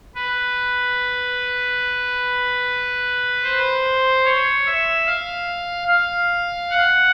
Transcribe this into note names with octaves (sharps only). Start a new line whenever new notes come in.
B4
C5
C#5
E5
F5
F5
F#5